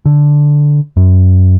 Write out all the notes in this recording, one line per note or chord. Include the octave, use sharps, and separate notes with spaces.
D3
F#2